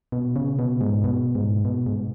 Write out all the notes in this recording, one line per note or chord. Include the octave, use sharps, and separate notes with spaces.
B2
C#3
B2
G#2
B2
G#2
B2
G#2